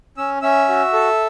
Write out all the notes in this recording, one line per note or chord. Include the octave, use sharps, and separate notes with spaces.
C#4 E6
C#4 E5 E6
F#4
A4